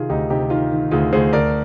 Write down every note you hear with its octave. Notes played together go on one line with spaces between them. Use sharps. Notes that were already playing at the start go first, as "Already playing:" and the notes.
Already playing: C3 D#3 F4 G#4
D2 D#4 G4
C3 D#4 G4
D#3 F4
D#3
D2 F4 G#4
D2 G#4 C5
D2 A#4 D5